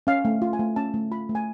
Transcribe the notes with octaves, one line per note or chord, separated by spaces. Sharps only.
C#4 F5
A3
F4
G#5
A3
C#4 A5
A3
F4 B5
A3
G#5